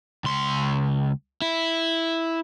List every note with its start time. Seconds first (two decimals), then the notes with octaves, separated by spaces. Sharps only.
0.24 C#2 C6
1.42 E4